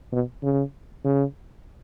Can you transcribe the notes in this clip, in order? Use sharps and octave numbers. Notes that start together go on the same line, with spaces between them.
B2
C#3
C#3